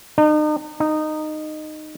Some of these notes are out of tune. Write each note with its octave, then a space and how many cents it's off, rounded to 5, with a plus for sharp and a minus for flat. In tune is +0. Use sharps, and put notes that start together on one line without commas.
D#4 -40
D#4 -15